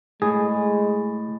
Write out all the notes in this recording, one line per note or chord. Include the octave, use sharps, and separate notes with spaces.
A2 G#3 G#4